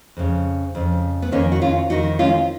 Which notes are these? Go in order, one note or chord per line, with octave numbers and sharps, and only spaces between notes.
F2 C#3
F2 C#3
B3
F2 D#3 A#3 C#4
F#4
C#4 F4
F2 D#3 D#4 F#4
C#4 F4